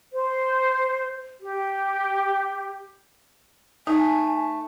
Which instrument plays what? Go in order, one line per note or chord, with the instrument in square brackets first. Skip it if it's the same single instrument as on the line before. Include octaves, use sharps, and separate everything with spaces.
[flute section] C5
G4
[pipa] A3 [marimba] D#4 [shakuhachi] G#5